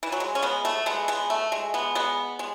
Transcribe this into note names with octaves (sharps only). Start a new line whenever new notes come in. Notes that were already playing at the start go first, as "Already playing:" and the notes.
E3
F#3
G#3
C#4
G#3 B3
A3
G#3 B3
G#3 B3
A3
G#3
G#3 B3
G#3 B3
G#3